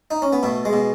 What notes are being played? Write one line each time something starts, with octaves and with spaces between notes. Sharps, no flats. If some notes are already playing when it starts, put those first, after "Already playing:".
D#4
C#4
B3
B2 A3
G#3
B2